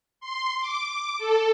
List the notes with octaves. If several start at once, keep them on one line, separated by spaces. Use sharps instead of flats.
C6
D6
A4